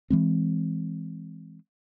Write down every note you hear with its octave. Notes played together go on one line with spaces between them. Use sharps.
E3 G#3 C4